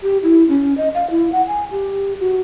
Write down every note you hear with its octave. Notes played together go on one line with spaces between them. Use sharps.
G4
E4
C#4
D#5
F5
E4
F#5
G#5
G4
F#4